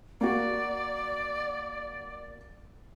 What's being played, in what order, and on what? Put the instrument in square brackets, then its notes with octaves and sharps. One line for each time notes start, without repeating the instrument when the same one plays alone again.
[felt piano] A#3 F#4 [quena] D5